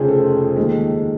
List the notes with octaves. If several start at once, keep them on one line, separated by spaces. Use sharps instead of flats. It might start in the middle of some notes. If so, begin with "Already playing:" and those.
Already playing: F1 F2 C#3 G#4 C5
A4
D#2 D#3 G#3